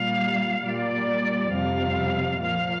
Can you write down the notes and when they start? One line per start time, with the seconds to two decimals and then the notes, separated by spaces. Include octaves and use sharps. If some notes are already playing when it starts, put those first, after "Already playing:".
Already playing: A#2 G3 F5
0.64 A#2 G3 D5
1.52 F2 C3 G3 F5
2.40 A#2 F3 F5